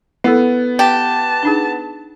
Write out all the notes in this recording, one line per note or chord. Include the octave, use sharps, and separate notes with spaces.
B3 E4 A4
G4 A5
D4 D#4 G#4